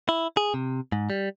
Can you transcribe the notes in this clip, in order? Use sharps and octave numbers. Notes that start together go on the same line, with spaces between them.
E4
G#4
C3
G#2
G3